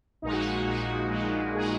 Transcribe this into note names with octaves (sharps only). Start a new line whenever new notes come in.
A#1 A#2 G#3 D#4
F#4
D#4
A#1 A#2 G#3 F#4
A#1 A#2 G#3
A#2 G#3 G#4